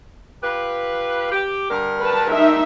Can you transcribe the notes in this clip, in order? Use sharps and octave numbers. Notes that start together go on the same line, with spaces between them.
F4 G4 B4
G4
G2 D3 A#4
B4 A5
D#4 E5